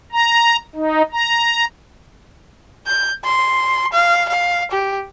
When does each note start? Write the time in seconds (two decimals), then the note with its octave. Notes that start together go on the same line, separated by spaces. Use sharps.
0.12 A#5
0.76 D#4
1.12 A#5
2.87 G6
3.25 C6
3.93 F5
4.29 F5
4.71 G4